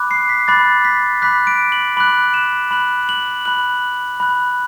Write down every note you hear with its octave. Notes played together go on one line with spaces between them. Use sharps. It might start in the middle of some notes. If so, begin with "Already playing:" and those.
Already playing: B5 D6 F#6
C7
B6
B5 D6 F#6 A6
B6
B5 D6 F#6 B6
D7
F#7
B5 D6 F#6 F#7
E7
B5 F#6 F#7
F#7
B5 F#6 F#7
B5 F#6